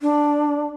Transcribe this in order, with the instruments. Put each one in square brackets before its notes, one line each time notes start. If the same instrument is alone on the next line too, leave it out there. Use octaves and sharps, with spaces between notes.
[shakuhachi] D4